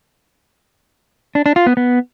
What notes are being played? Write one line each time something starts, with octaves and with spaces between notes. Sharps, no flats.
D4
D4
F4
B3
B3